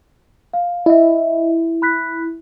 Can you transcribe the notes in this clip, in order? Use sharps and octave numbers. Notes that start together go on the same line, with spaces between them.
F5
E4 D#5 E5
B5 F#6 B6